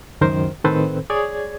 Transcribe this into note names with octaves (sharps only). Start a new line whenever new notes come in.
C#2 F#2 D#3 A#4 C5
A2 D#3 C4 A4 B4 C5
G#4 C#5 D5 G#6